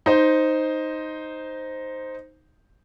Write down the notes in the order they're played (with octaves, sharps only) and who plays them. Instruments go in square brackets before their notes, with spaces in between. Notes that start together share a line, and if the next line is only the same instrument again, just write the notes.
[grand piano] D#4 C5